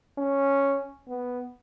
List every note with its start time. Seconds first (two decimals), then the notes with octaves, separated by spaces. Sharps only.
0.18 C#4
1.08 B3